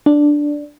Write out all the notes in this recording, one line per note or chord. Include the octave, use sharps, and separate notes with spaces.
D4